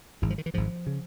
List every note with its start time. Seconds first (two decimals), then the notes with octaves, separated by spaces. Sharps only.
0.22 G#1 G#2 E3
0.30 F3
0.38 D#3
0.46 E3
0.54 G#1 G#2 F3
0.87 C#3